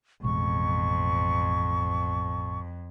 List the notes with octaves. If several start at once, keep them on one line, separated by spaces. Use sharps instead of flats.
A1 F2 B2 G#3 C#6